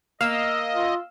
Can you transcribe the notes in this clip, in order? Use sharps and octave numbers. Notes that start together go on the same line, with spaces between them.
A#3 D#5 F5 E6
F4